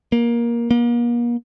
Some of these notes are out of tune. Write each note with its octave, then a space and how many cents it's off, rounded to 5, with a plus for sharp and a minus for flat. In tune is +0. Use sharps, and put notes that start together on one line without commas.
A#3 +15
A#3 +40